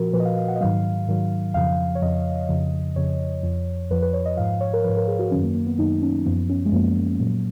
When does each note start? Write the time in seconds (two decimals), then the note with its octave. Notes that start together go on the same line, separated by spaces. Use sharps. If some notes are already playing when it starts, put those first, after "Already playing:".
Already playing: A#2 F3 F#4 A#4
0.13 A#2 F3 B4
0.20 D#5
0.25 F5
0.37 F5
0.48 F#5
0.56 D#5
0.61 G#2 D#3 F#3 F5
1.08 G#2 D#3 F#3
1.54 F2 C#3 F3 F5
1.95 C#5
2.02 F2 C#3 F3 D#5
2.49 F2 C#3 F3
2.96 F2 C#3 F3 C#5
3.43 F2 F3
3.91 F2 F3 B4
4.02 B4
4.13 C#5
4.26 D#5
4.37 G#2 F3 F5
4.61 C#5
4.74 A#4
4.84 F3 B4
4.89 G#2
4.97 A#4
5.08 G#4
5.19 F#4
5.31 F#2 D#3 F#3 C#4
5.43 A#3
5.55 A#3
5.67 B3
5.78 F#2 D#3 F#3 D#4
6.02 C#4
6.26 F#2 F3 B3
6.50 C#4
6.66 G#3
6.72 F#2 F3 A#3
7.20 A#2 F#3